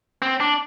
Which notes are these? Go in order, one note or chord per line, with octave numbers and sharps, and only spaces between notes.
C4
D4